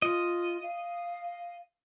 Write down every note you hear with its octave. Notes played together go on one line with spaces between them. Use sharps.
F4 D#5
F5